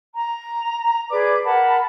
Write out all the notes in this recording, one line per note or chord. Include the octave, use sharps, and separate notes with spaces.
A#5
G#4 B4 D5 D6
A#4 F#5 A5 B5